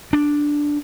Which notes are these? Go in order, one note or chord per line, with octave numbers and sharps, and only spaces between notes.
D4